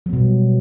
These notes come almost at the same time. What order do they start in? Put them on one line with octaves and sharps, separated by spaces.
F#3 B3 B2 G3